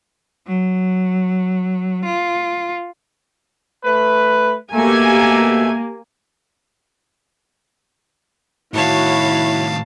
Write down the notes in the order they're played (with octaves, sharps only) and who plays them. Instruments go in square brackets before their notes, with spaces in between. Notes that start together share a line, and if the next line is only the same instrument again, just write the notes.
[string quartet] F#3
F4
[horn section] A3 B4
[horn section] B2 A3 [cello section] A#3 [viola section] G4 G#5
[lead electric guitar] A2 D#3 [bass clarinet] E4 [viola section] F#4 C#5 B5 [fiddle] F5 A5